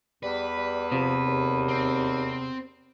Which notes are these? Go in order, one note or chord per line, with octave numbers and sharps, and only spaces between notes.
E2 G3 B4
G3
C3 F3
D#2
C4